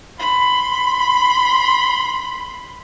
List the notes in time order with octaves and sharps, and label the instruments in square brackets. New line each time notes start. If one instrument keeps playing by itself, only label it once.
[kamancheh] B5 C6